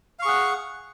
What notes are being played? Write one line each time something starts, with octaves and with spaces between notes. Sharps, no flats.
G#4 F5 F#5 C#6